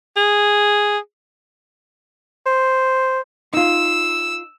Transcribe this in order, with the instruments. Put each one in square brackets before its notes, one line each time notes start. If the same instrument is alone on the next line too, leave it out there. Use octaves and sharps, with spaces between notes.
[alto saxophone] G#4
[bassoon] C5
[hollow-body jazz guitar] D#4 F4 [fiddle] E6